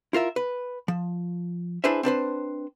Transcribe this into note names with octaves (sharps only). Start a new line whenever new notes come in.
E4 F4 A#4 E5
B4
F3
D4 E4 G#4 B4 C5 E5
C4 D4 B4 C5